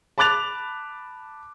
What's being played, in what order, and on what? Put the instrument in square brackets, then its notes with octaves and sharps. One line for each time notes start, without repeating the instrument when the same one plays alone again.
[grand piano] A5 B5 D6 F#6 A6 F7